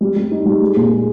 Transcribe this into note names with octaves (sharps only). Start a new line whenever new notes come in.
G3
G3
D#4
G3
G#3
A#2
G#3